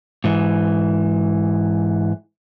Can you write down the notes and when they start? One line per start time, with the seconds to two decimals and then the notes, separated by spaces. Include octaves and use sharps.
0.24 G#2 E3